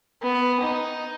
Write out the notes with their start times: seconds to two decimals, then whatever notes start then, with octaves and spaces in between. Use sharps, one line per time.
0.22 B3
0.60 D#4